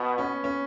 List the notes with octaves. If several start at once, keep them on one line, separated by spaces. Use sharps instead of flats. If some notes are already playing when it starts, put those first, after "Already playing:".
Already playing: B2 B3
C#4
C#4